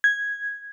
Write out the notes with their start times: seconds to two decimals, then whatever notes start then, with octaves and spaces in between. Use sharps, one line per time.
0.04 G#6